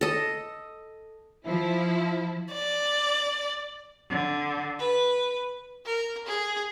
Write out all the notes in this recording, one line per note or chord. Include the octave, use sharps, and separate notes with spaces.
A4 D#5
F3 E4
D5
D3
B4
A#4
G#4